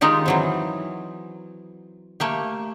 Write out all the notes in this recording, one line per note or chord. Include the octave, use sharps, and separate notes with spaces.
D#3 G#3 D#4 F4 G4
E3 F#3 C4
A3 A#3 G4